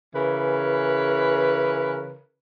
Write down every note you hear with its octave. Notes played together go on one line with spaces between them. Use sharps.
C#3 E3 A#4 B4